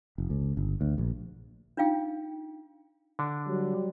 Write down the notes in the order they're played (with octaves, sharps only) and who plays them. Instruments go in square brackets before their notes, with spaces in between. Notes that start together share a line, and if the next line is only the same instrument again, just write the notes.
[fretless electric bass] F1
C#2
G1
D2
A#1
[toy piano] D4 D#4 F4 F5 G5
[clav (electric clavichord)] D3 D4
[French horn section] F#3 G3